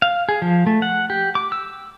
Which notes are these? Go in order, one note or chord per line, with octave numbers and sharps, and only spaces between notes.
F5
G#4
F3
A3
F#5
G4
D6
E6